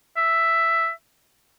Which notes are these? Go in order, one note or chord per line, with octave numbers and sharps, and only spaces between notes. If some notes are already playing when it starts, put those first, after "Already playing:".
E5